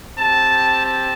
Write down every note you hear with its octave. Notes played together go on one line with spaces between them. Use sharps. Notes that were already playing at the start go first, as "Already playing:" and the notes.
C4 G4 A5
A5